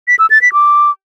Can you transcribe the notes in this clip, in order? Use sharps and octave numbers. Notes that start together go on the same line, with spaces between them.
B6
E6
A6
B6
D6